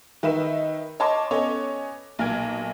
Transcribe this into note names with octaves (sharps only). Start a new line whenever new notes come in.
D#3 D#4 B4 E5 E7
C#5 D#5 A5 C6 D6
B3 C#4 A4 C#5 D#5
B1 A#2 F6 G#6 D7